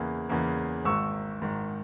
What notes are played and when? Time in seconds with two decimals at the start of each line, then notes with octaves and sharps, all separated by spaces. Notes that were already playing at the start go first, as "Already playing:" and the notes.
Already playing: E2 C#3 E3 A#3
0.29 E2 C#3 E3 A#3
0.85 G#1 G#2 D#3 C#6 E6
1.41 G#1 G#2 D#3